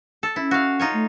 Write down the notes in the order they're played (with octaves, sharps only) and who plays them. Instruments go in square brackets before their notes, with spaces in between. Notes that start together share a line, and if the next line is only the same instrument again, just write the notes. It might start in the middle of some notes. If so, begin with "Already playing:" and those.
[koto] A4
[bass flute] C#4 [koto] E4
[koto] F#4 F5
D#4 F4 C#5
[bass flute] A3